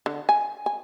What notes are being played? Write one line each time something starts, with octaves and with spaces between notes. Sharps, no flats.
D3
G#5
G#5